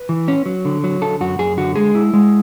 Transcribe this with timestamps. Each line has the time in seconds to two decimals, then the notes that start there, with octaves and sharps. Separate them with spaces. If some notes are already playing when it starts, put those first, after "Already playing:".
Already playing: B4
0.09 E3
0.28 C#4
0.46 F#3
0.65 D3
0.84 F#3
1.01 D3 A4
1.21 F#2 F#4
1.39 F#2 G#4
1.57 D3 F#4
1.76 G#3 G#4
1.95 E4
2.14 G#3